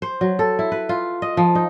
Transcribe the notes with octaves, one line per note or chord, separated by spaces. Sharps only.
C5
F#3
A4
E4
B4
F4
D#5
F3
D#4